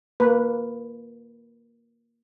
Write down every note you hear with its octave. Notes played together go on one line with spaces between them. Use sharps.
A#3 B4